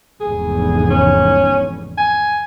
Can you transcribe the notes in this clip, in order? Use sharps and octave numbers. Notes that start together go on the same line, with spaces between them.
F1 E2 G#2 G#4
C#4
G#5